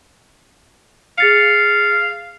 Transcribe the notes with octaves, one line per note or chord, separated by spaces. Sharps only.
G#4 F5 A6 C#7